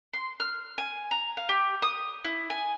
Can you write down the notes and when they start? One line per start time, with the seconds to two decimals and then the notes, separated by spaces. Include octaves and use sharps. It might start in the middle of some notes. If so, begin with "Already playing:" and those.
0.13 C6
0.40 F6
0.78 G#5
1.11 A#5
1.37 F5
1.49 G4
1.82 D#6
2.25 E4
2.50 G#5